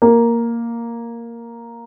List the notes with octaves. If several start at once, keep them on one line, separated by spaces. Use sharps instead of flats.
A#3